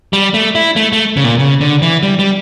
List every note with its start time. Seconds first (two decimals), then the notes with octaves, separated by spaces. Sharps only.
0.13 G3
0.34 A3
0.55 E4
0.76 A3
0.93 A3
1.17 C#3
1.24 A#2
1.39 C#3
1.61 D3
1.82 E3
2.03 G3
2.19 G3